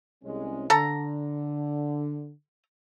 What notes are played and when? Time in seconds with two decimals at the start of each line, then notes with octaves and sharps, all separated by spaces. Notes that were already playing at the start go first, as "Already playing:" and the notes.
0.24 C2 G#3 C#4
0.70 D3 A4 A#5